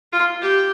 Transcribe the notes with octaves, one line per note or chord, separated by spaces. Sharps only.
F4
G4